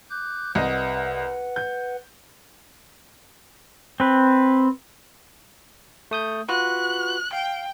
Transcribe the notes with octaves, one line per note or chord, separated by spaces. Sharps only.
D6 F#6 G6
C2 B4 D#5 F#5
G6
C4 B4
A3 D#6 G6
F4 F#4 B4 F#6
F5 G5